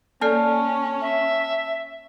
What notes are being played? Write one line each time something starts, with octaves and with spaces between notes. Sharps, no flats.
A#3 C#4 A4 D5 A5 F6
E5